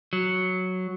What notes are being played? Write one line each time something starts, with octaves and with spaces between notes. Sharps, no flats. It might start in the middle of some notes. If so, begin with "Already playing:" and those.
F#3